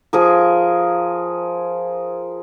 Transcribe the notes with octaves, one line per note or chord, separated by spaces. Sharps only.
F3 G#4 A#4